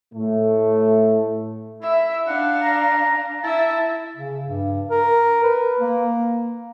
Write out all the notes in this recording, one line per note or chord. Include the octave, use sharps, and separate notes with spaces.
A2 A3
E4 E5
D4 F5 F#5
A#5
E4 E5 A5
C#3
G2
A#4
B4
A#3